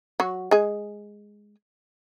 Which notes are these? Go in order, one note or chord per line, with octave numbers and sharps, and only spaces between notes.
F#3 F#4
G#3 G#4